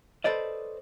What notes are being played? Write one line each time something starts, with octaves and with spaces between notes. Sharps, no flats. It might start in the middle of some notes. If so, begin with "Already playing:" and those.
A4 B4 C5 D5 D#5